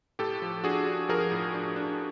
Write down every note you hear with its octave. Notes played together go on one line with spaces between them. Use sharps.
A2 G4 A4
F3
D4 F#4 G#4
D4
F3 G#4 A#4
A2
D4
D4